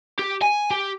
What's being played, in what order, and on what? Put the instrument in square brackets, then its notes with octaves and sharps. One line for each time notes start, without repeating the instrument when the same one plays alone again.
[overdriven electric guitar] G4
G#5
G4